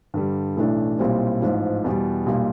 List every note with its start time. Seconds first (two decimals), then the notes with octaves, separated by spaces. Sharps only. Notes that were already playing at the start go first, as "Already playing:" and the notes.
0.14 G2 D3 G3
0.57 B1 A2 E3 A3 D4
0.99 B1 A#2 G3 C4 E4
1.42 A1 G#2 F3
1.84 E2 B2 G3
2.26 B1 A#2 G3